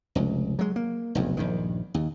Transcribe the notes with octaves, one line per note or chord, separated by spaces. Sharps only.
F1 C#2
F#3 G#3
A#3
F1 B1 E2
A#1 G2 D#3
D#2